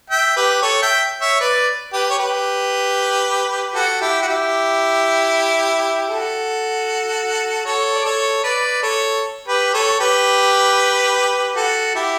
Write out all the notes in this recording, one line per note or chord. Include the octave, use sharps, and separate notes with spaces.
E5 G5
G4 B4
A4 C#5
E5 G5
C#5 E5
B4 D5
G4 B4
C#5
G4 B4
F#4 A4
E4 G4
F#4
E4 G4
F#4 A4
A4 C#5
D5
A4 C#5
B4 D5
A4 C#5
G4 B4
A4 C#5
G4 B4
F#4 A4
E4 G4